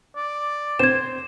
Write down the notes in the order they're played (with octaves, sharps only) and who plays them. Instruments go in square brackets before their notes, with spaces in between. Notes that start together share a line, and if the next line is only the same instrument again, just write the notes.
[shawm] D5
[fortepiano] C4 C5 [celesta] G#6 E7